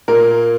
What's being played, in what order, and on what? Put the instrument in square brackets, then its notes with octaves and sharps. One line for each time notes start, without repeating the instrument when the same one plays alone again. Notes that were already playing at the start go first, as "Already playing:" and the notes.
[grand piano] A#2 A#3 A#4